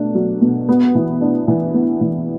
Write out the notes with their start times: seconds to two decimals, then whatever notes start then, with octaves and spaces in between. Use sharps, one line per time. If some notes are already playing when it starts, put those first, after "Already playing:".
Already playing: B2 A3 D4
0.15 F#3
0.41 B2
0.69 B3
0.95 E3
1.21 D4
1.48 E3
1.74 B3
2.01 E3